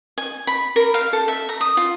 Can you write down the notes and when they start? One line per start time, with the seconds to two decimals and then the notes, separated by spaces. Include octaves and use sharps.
0.18 G#5
0.47 B5
0.76 A#4
0.94 F5
1.13 A4
1.28 E5
1.49 A#5
1.61 D#6
1.77 F4